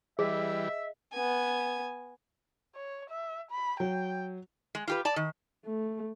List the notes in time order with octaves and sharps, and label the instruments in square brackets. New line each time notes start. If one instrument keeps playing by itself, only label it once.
[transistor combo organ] E3 G3 [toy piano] G#4 [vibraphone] D#5 [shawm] E5
[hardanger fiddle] B3 G#5
[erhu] C#5
E5
B5
[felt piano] F#3 [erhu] G5
[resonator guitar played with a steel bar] G#3
F4 G4 B4
D5 A5
D#3
[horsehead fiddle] A3